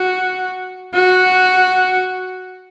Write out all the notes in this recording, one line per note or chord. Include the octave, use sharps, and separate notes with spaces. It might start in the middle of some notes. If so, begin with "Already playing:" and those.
Already playing: F#4
F#4